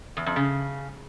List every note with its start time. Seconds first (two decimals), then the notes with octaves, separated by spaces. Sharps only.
0.17 E2
0.26 F2
0.36 C#3